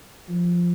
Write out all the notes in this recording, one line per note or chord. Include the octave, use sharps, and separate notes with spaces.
F3